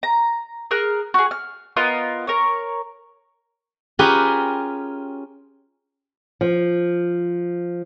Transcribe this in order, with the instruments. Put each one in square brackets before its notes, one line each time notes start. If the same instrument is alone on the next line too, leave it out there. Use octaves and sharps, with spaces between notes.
[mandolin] A#5
G#4 A#4 F6 F#6
F#4 G#4
F6
B3 F4 A#4 D#5
A#4 C#5
[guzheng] C#4 F4 G4 G#4 A#4 B4
[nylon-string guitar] F3